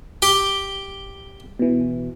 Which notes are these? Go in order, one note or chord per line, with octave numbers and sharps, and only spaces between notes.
G4 G5
B2 E3